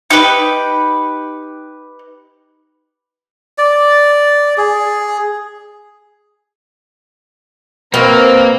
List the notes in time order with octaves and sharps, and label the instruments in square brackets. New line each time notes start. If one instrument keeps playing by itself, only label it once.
[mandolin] D#4 G4 B4
[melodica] D5
G#4
[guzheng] B2 [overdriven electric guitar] A#3 [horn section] C4 [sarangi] A#4